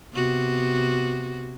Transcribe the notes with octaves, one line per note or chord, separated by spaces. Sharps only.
C3 B3 F#4